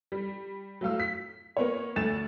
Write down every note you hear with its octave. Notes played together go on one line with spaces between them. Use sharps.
G3
F#3 A3 F5 E6
B6
A#3 B3 C#5
D2 A3 A6 E7